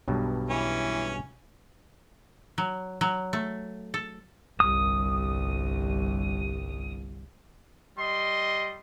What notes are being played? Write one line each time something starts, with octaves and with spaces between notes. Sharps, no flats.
B1 G2 B2
E3 C#4
F#3
F#3
A3
A4
G1 C2 D#6
G3 D#5 C6